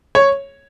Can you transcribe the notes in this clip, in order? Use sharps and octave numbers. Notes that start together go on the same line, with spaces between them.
C#5